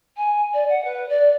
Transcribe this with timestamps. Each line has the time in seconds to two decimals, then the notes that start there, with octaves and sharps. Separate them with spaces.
0.16 G#5
0.53 D5
0.69 F#5
0.84 B4
1.09 D5